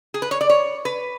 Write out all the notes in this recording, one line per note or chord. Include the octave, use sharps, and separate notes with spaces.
G#4
B4
C#5
D5
C#5
B4